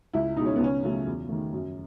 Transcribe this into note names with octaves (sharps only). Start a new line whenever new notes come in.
C#2 E4
B2 G#3 D#4
C#4
B3
C#2 C#4
C#3 F#3 A3
E2
D#3 A3
F#2